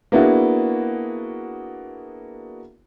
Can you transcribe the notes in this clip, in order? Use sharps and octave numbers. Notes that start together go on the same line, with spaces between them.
A#3 B3 D4 E4 F#4 G#4